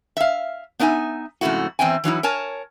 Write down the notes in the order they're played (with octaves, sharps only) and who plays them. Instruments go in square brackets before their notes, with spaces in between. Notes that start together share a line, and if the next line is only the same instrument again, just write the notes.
[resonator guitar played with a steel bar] E5 F5
B3 D4 D#4 E5 G#5
F2 G#2 C#3 A3 E4 F#4
E2 C4 E5 G5 G#5
E3 F#3 D#4 E4
A#4 C#5 G#5 A5